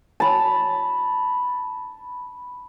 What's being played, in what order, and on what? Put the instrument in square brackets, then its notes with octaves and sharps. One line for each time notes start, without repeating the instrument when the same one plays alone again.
[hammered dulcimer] A5 B5